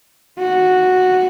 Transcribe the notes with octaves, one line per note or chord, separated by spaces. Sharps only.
F#4